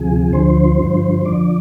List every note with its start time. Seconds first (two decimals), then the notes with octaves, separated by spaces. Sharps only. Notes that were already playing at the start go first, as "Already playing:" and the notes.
Already playing: D2 C3 F3 G#4
0.33 D2 D3 F3 C5
0.80 G2 D3 F3
1.25 F2 D3 F3 D5